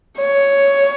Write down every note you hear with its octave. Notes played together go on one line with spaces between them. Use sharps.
C#5